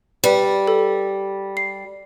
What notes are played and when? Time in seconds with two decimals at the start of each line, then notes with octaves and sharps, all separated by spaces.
0.24 G3 B4
0.67 A4
1.57 C7